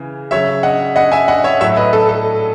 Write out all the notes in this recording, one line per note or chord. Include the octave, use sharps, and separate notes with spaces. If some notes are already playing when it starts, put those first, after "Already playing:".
Already playing: C#3 E3
C#3 F#3 C#5 E5
D#5 F#5
D#5 F#5
E5 G#5
D#5 F#5
C#5 E5
A2 F#3 C#5 E5
B4 D#5
A4
A4